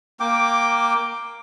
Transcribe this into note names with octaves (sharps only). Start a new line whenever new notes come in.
A#3 G5 D6